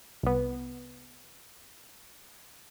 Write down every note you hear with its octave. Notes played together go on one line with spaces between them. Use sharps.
C2 B3